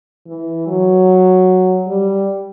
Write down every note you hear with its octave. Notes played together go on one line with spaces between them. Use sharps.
E3
F#3
G3